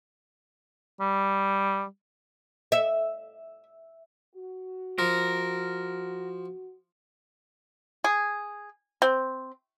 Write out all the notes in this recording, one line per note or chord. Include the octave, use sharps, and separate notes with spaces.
G3
E5
F#4
F3 A#4
G#4
C4